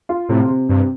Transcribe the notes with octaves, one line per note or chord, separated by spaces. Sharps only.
F4
A2 C3
C3
G2 C3